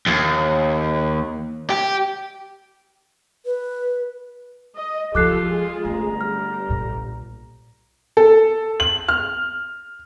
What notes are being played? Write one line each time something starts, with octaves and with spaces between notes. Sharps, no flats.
D#2
G4
B4
D#5
E3 F3 F4 G4 A4 D6 F#6 C7
G#3 G#4
G1 A3 C#4 A#5
G3 F6
B1 A#2
A4
F#7
F6